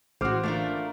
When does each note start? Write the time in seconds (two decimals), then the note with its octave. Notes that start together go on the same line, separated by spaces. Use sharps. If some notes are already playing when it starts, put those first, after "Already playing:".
0.21 A1 G#3 F#4 C5 D6 F6
0.43 A3 A#3 D4 F4 A#4